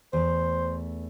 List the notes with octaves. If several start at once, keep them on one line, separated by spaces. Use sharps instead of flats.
E2 A3 C5